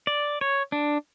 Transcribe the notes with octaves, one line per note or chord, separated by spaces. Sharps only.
D5
C#5
D4